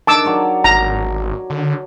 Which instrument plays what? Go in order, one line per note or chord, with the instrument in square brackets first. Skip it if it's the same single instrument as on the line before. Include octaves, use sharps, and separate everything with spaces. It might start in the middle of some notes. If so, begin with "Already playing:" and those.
[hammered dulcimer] D#3 D4 [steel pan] A5 D6 E6
[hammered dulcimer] F#3 C#5 D5
[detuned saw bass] G#1 [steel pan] A#5
[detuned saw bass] D3